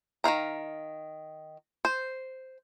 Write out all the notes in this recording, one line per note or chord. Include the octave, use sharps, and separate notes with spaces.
D#3 E3 F5 A#5
C5